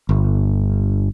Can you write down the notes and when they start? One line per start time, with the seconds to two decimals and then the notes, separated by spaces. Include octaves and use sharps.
0.09 G1